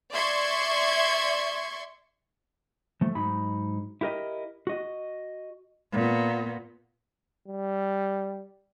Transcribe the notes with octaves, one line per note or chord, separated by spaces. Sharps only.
D5 E5 C6 C#6 G#6
F3 A3
G#2 F#3 D#4 B5
E4 G4 A#4 D#5
F#4 D#5
A#2 B3
G3